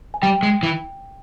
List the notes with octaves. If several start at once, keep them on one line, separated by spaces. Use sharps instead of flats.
G#5
G3 G5
G#3
E3